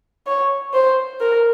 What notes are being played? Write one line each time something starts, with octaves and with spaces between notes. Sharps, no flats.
C#5
C5
A#4